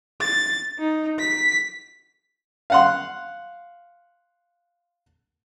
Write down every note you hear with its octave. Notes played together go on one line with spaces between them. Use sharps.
A6
D#4
B6
F5 F#5 C6